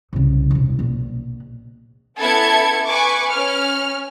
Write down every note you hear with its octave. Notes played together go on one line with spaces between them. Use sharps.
C2 C#3
E1 C2
A#1 B2
B3 C#4 E4 A4 G#6 C#7
B4 G#5 C#6 D6
C#4 F6